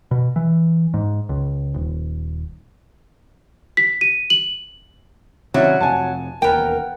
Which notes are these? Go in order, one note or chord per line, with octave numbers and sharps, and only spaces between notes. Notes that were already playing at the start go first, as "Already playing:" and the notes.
B2
E3
G#2
C#2
D#1
B6
D#7
F#7
C3 D#3 F#3 C4 C#4 E4 D5
F2 C3 G#5 A5
E1 D#2 B3 A#4 G5